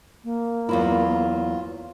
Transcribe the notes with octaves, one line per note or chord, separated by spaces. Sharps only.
A#3
E2 F#3 E4 F4